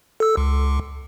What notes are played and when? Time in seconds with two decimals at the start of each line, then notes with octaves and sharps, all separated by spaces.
0.20 A4 E6
0.37 C#2